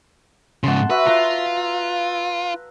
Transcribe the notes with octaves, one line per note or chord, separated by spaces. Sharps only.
G#2 C#3 F#5 A5 C6
F#4 B4 E5
F4 B4 F5 A#5